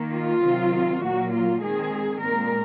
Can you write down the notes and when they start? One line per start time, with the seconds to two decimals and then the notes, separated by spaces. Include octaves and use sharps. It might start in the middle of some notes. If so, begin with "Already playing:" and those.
Already playing: D#3 A#3
0.13 F4
0.42 C3 D#3 F#3 C4
1.01 A#2 F#3 A#3 F#4
1.32 F4
1.60 D#3 G#3 C4 G#4
2.20 A#2 G#3 C4 A#4